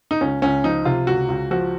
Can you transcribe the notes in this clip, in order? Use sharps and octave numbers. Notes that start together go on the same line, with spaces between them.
D#4
C#2 C#4
C#2 C#4
F3 D#4
C3 F4
C#2 F#4
C#2
F3 F#4